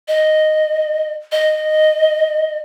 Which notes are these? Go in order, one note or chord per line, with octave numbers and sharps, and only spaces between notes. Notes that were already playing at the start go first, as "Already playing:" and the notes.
D#5
D#5